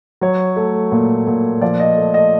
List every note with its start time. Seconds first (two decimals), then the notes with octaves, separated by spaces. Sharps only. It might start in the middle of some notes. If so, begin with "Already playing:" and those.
0.21 F#3 C#5
0.56 A3
0.92 A#2
1.27 A#2
1.61 F3 D5
1.80 D#5
1.96 A3
2.14 D#5